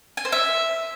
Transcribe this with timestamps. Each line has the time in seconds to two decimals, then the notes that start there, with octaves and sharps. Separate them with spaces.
0.17 G#5
0.25 C5
0.32 E5